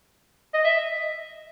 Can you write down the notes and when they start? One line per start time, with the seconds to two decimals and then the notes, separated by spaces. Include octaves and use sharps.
0.54 D#5
0.64 E5